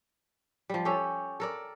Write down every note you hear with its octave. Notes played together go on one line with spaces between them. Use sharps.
F3 G3
C#4 G4 A4
A4 A#4 D5